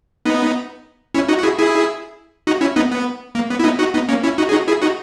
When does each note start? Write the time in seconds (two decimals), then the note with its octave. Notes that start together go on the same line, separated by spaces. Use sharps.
0.25 B3 D#4
1.14 C#4 E4
1.28 D#4 F#4
1.39 F#4
1.43 E4 G#4
1.58 E4 G#4
2.47 D#4 F#4
2.61 C#4 E4
2.76 B3 D#4
2.91 B3
3.35 A#3
3.50 B3
3.59 E4
3.64 B3 D#4
3.79 D#4 F#4
3.94 B3 D#4
4.09 A#3 C#4
4.23 C#4 E4
4.38 D#4 F#4
4.49 G#4
4.52 D#4 F#4
4.68 E4 G#4
4.82 D#4 F#4